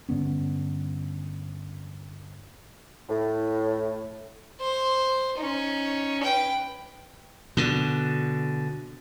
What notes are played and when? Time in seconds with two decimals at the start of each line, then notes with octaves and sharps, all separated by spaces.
0.09 G2 D3 B3 C#4
3.09 A2
4.60 C5
5.38 C#4 D#4
6.22 B4 G5
7.57 B2 D3